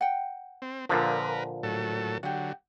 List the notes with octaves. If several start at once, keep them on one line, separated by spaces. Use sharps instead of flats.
F#5 G5
C4
A#2 D3 F3 A#4 B4 D#5 F5
A2 F#3 A4
D3 F#3 G4 F#5